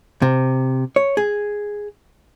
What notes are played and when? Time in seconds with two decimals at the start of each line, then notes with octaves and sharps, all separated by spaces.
0.22 C3
0.96 C#5
1.17 G#4